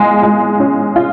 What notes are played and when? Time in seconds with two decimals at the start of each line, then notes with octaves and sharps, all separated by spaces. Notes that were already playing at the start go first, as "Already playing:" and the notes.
Already playing: G#3 F4
0.23 G#3
0.60 C#4
0.96 F4